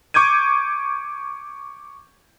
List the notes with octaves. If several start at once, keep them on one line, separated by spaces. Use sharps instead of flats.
C#6 D6 G6 G#6 D#7